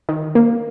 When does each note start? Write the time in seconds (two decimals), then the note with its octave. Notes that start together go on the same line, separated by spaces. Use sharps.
0.09 D#3
0.35 A#3